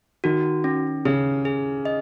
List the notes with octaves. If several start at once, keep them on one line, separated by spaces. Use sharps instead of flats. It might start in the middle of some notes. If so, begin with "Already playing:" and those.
D#3 F#4
C#4
C#3 G#4
G#4
D#5